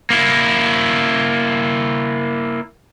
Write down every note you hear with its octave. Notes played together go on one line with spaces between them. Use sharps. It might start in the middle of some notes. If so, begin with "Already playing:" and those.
A#3 E4